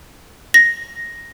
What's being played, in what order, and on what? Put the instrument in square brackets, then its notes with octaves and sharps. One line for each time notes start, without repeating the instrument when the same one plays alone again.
[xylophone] A#6